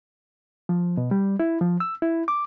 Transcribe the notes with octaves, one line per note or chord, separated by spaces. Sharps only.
F3
B2
G3
E4
F3
E6
E4
D6